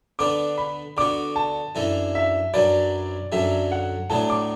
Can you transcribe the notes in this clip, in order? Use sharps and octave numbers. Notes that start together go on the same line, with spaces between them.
D3 B3 D4 B4 D6
B5
D3 B3 F#4 D6
A5
F#2 E3 D4 A4
E5
F#2 F#3 D4 B4 D5
F#2 D3 F#3 D4 E5
F#5
A2 F#3 B3 D4 A5
D6